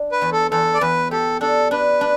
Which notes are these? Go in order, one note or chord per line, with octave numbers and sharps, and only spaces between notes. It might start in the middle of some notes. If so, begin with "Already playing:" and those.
Already playing: D4
B4
E2
A4
E2 A4
D5
E2 B4
G4 A4
D4 A4
D4 B4
D4